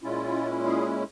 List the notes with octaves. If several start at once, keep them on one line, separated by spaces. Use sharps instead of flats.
A#2 G#3 C#4 E4 F4
G#4